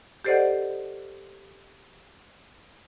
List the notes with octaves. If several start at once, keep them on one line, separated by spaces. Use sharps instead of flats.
G4 A4 C5 D5 D#5 F#5